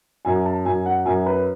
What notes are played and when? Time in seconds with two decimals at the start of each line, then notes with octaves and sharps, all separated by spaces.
0.25 F#2 G#5
0.45 A5
0.65 F#2 G#5
0.86 F#5
1.06 F#2 G#5
1.26 B4